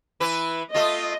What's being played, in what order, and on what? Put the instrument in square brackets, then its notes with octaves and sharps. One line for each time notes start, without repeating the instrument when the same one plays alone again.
[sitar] E3 E4 B4
[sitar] A3 F4 [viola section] D#5